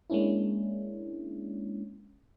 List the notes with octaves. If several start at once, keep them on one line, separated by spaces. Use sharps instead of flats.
G#3 A#3 C#4 D4 E4